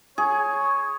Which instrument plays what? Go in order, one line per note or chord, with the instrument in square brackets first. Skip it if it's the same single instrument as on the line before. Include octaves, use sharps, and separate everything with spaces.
[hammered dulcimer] G#4 [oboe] C#5